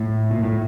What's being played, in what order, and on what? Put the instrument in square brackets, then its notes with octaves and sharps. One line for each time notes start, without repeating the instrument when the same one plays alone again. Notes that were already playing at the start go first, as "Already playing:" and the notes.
Already playing: [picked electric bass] A2
A#2
A2